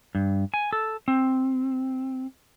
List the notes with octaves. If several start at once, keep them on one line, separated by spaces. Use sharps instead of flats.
G2
G#5
A4
C4